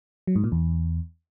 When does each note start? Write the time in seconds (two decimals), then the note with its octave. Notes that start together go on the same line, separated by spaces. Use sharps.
0.27 F#3
0.36 G#2
0.44 A#2
0.52 E2